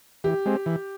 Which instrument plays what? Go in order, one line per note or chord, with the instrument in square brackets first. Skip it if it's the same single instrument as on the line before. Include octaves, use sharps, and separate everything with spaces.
[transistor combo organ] E3 [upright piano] G4
[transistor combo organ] G#3 C4
E3